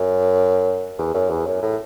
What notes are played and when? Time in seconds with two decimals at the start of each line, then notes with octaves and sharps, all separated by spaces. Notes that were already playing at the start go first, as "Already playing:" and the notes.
Already playing: F#2
0.98 E2
1.14 F#2
1.30 E2
1.47 F#2
1.62 A2